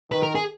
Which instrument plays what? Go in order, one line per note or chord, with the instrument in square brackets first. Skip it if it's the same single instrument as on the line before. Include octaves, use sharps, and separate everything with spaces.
[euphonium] D#3 [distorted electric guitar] B4
[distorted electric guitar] A#4
G#4